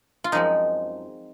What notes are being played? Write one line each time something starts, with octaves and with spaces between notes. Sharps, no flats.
F4
F#2 F3 G#3 C4 D#4